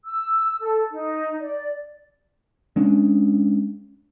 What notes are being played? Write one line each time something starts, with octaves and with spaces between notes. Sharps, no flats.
E6
A4
D#4
D5
G#3 C#4 D4